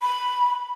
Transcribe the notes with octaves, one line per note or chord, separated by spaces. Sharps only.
B5